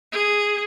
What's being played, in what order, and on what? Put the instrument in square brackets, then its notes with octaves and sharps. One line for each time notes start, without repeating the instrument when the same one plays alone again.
[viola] G#4